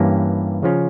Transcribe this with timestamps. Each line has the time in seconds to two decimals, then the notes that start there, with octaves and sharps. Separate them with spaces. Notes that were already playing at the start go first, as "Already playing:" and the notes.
Already playing: G2 E3 A#3 C#4 G4
0.63 C#3 F3 C#4 F4